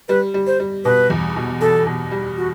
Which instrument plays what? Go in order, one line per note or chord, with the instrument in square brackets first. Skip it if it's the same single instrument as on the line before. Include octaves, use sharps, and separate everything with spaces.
[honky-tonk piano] G3 [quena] B4
[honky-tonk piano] G3
[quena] C5
[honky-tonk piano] G3
[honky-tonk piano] B2 [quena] B4
[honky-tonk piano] E2
B2
[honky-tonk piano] B2 [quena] A4
[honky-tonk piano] B2
G3
[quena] F#4